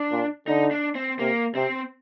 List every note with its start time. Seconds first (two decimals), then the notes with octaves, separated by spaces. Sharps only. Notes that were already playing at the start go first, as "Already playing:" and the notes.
Already playing: D4
0.11 A#2
0.47 D3 D#4
0.71 D4
0.95 C4
1.19 C3 A#3
1.55 C3 C4